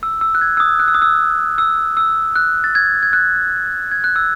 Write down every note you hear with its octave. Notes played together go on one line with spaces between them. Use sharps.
E6
E6
F#6
G#6
E6
D#6
F#6
E6
D#6
E6
E6
E6
F#6
A6
G#6
G#6
F#6
G#6
F#6
E6